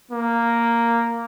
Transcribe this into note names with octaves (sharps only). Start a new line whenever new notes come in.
A#3